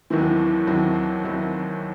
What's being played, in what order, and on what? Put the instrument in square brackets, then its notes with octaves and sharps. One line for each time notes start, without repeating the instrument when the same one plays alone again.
[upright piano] D#2 D#3 F#3 C4 E4 [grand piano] E3
[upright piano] D#2 D#3 F#3 C4 E4
D#2 D#3 F#3 C4 E4